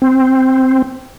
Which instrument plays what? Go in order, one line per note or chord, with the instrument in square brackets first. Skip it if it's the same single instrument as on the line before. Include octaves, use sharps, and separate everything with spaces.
[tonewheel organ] C4